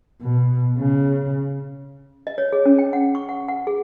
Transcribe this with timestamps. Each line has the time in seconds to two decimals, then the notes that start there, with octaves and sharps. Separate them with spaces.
0.22 B2
0.79 C#3
2.27 D#5
2.38 C#5
2.52 G#4
2.66 C#4
2.78 G5
2.93 F#5
3.15 C#6
3.29 F#5
3.49 F#5
3.67 G#4